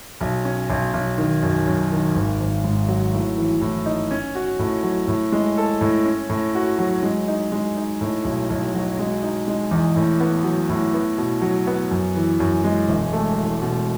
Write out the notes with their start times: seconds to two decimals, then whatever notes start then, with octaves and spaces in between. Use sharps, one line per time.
0.21 B1
0.45 C#4
0.70 B1
0.94 B1
1.18 D#3
1.43 F#2
1.67 F#2
1.92 D#3
2.16 G#1
2.41 G#1
2.64 G#2
2.88 F#3
3.14 A2
3.37 E3
3.61 A2
3.86 D#4
4.11 C#4
4.35 F#4
4.59 A2
4.83 F#3
5.08 A2
5.32 G#3
5.58 A4
5.81 A2
6.05 C#4
6.30 A2
6.55 F#4
6.79 F#3
7.03 G#3
7.28 D#4
7.52 G#3
7.77 D#4
8.01 A2
8.25 B1
8.50 B1
8.74 F#3
8.99 G#3
9.23 D#4
9.48 G#3
9.71 E2
9.96 A2
10.20 B3
10.44 F#3
10.70 A2
10.94 B3
11.18 B2
11.41 F#3
11.67 B3
11.91 F#2
12.16 E3
12.40 F#2
12.64 G#3
12.89 E1
13.13 A3
13.38 E2
13.62 B2